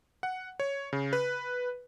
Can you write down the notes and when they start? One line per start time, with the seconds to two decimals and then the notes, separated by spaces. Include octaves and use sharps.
0.23 F#5
0.60 C#5
0.93 C#3
1.13 B4